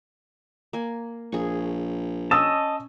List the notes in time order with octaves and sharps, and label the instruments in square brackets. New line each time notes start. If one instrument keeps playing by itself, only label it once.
[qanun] A#3 G#5
[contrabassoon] A#1 [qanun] G#4 C#6
[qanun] C#4 [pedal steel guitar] D#5 A5 [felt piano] D#6 E6